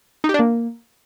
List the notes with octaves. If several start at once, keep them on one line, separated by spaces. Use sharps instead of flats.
D#4
G4
D4
A#3